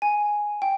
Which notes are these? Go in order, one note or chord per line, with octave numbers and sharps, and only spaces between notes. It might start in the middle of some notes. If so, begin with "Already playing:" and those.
G#5
G5